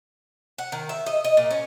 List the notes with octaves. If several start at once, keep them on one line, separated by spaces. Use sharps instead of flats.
F#5
D#3
E5
D#5
D#5
A#2
C#4